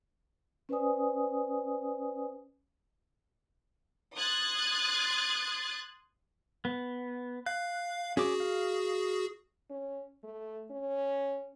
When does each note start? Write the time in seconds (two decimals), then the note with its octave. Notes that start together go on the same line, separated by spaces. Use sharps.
0.69 C#4 B4 C5 D5 G#5 D#6
4.16 C6 D#6 F#6 G#6 A6
6.65 B3
7.46 F5 F#6
8.17 C#4 F#4 G#4 D6
8.40 F5
9.70 C#4
10.24 A3
10.71 C#4